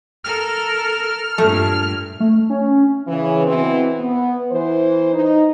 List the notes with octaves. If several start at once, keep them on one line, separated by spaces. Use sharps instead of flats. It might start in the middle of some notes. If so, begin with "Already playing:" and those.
A4 A#4 F6
G2 A#2 A3 A4
A3
C#4
C#3 E3
B2 E3 C4
B3
E3 C5
D#4